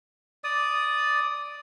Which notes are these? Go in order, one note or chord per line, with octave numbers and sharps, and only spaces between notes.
D5 D#6